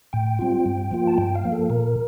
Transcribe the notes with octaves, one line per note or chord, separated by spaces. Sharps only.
A2 G5
G3 C4 F4
G2
F3 A#3 F4
A5
G2 G5
F5
F3 A#3
A4
A#2 A#4